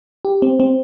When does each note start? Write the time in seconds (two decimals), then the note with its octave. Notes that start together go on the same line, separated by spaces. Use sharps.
0.25 G4
0.42 C4
0.60 C4